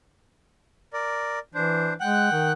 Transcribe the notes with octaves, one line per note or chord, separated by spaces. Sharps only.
A#4 D5
E3 D4 C5
G#3 F#5 G5 F#6
D#3